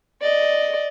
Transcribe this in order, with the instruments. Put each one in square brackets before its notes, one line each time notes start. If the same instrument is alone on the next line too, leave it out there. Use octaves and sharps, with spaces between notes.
[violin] D5 D#5